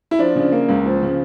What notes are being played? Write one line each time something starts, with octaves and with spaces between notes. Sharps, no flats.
E4
F3 D4
C#3
A#3
C#2
F3
C#3